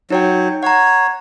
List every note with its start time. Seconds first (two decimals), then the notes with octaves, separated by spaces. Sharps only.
0.10 F#3 D#4 C#5 G5
0.63 C#5 F#5 A#5